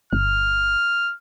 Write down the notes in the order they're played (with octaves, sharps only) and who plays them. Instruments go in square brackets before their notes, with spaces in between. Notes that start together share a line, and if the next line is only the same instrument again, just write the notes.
[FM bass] G1 [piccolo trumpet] F6